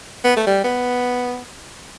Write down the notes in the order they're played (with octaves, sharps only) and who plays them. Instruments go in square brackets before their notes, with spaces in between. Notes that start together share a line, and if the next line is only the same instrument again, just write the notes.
[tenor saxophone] B3
A3
G3
B3